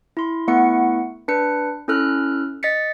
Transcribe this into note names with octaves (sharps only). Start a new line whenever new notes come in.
E4 C6
A3 B3 E4 F#5 C#6 C#7
D4 B4 C#7
C#4 E4 A4 F6 F#6
D#5 A6 B6 C#7